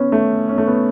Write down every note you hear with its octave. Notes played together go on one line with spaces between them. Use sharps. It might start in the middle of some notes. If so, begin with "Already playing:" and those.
Already playing: B3 C#4
A3
C#4
A3
B3